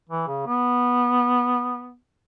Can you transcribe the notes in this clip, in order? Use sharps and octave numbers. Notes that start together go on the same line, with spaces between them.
E3
C#3
B3